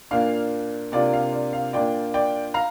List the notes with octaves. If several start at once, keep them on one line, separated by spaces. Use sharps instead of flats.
A#2 A#3 D4 F5
C3 A#3 D4 F4 D5
F5
D5
F5
A#2 A#3 D4 F4 D5 G5
D5 G5
F5 A#5